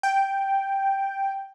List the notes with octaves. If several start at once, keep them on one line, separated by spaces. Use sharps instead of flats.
G5